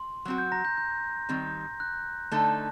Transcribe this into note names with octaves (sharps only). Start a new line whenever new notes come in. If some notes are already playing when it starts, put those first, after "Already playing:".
Already playing: C6
F#3 C4 F#4 F#6
G6
A#5 A#6
G6
G6
D#3 G3 C4
F#6
D3 A3 D#4 A4